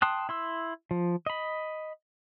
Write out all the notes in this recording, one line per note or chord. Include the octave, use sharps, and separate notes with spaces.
G5 A5 C6 D#6 F#6
E4 C6 E6
F3
D#5 B5